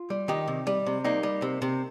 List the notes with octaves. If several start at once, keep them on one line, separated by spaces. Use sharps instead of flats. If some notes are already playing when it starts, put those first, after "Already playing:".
Already playing: F4
G3
D#3 D#4 G4
C3
G3
C3
G3 A#3 D#4
G3
C3
C3